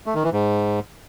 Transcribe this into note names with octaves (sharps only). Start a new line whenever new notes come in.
A3
D#3
E3
G#2